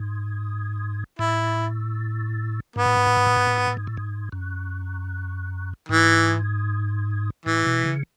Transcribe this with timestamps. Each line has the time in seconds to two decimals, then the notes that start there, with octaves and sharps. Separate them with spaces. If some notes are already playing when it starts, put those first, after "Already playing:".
Already playing: G#2
1.19 A2 E4
2.76 G#2 B3
2.86 A2
2.97 G#2
3.07 A2
3.17 G#2
3.26 A2
3.37 G#2
3.47 A2
3.57 G#2
3.67 A2
3.77 G#2
3.87 A2
3.97 G#2
4.32 F#2
5.89 G#2 E3
7.46 A2 E3
7.66 B2
7.85 C#3